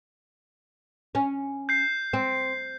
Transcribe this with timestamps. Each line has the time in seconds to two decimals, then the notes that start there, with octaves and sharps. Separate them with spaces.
1.15 C#4
1.69 G6 C7
2.13 C4